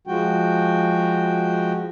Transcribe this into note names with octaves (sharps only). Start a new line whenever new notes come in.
F3 G#3 F#4 G5